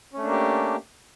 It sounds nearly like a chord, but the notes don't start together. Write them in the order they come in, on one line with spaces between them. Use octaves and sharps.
C#4 A3 D4 A#3 G4